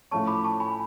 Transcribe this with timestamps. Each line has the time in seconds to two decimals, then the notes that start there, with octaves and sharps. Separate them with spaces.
0.11 A2 F3 A3 C#4 A5 C#6
0.27 B5 D6
0.44 A5 C#6
0.60 G#5 B5